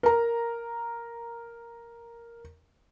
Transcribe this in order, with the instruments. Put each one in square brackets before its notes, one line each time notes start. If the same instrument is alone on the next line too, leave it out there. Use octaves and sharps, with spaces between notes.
[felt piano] A#4 A#5